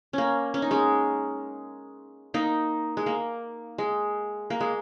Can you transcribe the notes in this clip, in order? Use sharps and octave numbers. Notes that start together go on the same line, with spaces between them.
A#3 C#4
C#4
D#4
G#3 C#4
A#3 D#4
G#3
A#3
G#3
A#3
G#3